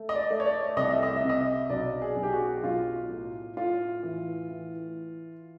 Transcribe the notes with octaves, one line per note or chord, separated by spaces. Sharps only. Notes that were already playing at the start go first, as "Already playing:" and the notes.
Already playing: A3
D#5
D5
A3
C#5
D5
C2 D#5
E5
D#5
E5
C3
D#5
B1 D5
G#4
B1
G4
F#4
B1 F4
A2
A2 F4
E3
E3